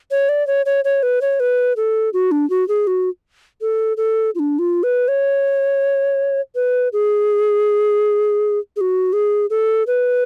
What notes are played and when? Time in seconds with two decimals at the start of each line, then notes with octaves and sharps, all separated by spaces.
0.11 C#5
0.29 D5
0.47 C#5
0.66 C#5
0.85 C#5
1.03 B4
1.21 C#5
1.40 B4
1.77 A4
2.13 F#4
2.31 D4
2.50 F#4
2.68 G#4
2.87 F#4
3.61 A4
3.97 A4
4.35 F4
4.39 D4
4.59 F4
4.83 B4
5.08 C#5
6.55 B4
6.93 G#4
8.77 G#4
8.81 F#4
9.13 G#4
9.50 A4
9.87 B4